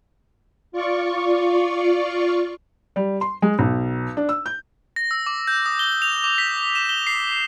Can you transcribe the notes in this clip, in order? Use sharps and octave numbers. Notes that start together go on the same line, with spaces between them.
F4 D5 C#6
G3
C6
G#3
B1
D4
E6
G6
A#6
E6
D6
G6
D#6
G7
F7
D6
B6
E7
G7
C7